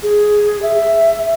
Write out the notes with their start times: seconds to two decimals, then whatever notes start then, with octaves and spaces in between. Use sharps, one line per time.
0.03 G#4
0.62 E5